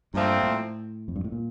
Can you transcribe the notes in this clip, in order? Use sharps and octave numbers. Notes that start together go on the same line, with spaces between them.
G2 A#2 F3 A3 C4
A2
F2
G2
A2
A#2